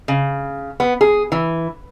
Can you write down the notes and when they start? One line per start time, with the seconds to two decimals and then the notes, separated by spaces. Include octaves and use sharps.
0.08 C#3
0.80 B3
1.01 G#4
1.32 E3